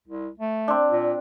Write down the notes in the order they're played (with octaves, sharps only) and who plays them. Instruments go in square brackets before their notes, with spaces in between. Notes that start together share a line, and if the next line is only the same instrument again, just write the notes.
[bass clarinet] C2
A3
[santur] C4 D4
[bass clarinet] A#2